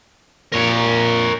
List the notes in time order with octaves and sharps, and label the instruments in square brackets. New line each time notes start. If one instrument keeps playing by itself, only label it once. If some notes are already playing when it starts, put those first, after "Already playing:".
[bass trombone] A#2 [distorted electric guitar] A#4 C#5